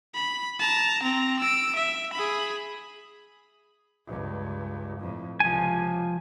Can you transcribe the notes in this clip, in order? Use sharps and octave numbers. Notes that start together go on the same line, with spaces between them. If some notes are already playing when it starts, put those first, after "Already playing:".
B5
A5 A#5
C4 A#5
E6 D7
E5
G#4 B5
C#2 G2
F2 A2
C#2 C3 F3 G#5